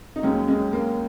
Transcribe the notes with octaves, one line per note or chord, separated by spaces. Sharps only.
D#4
D#2 D#3 F#3 G#3 C#4
G#3 C#4
A#3